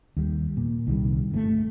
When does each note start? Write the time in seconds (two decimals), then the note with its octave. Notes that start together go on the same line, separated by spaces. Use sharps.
0.17 D#2 G3
0.57 A#2
0.87 C2 D#3 G3
1.32 G1 C#3 A3